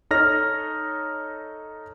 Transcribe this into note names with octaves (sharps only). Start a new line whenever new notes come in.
D#4 A4 C#5 D#5 F6 A#6